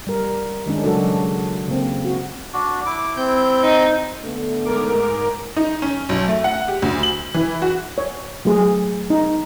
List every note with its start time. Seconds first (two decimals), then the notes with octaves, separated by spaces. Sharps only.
0.07 G3 A#4
0.66 D#3 G#3 C#4 D4
0.84 C#3 F#3 G#3 D4 F#4 A4
1.68 C#3 A#3 C4
2.05 F#4
2.53 D4 F#4
2.86 E4 D6
3.17 C4 G6
3.63 D#4
4.23 D3 A3 B3
4.65 G#2 A#4 D6
5.56 D#4
5.82 C#4
6.09 B1
6.28 A3
6.44 F#5
6.68 G4
6.82 D2
7.03 F#7
7.34 E3
7.62 F#4
7.98 C#5
8.45 F#3 A3 G#4
9.10 D#4